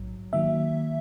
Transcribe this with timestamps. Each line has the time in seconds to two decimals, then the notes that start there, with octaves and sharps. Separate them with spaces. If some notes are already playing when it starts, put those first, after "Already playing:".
Already playing: A#1 G#2 F#3
0.33 D#3 F#3 A#3 E5